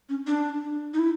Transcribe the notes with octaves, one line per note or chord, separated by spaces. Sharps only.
C#4
D4
D#4
E4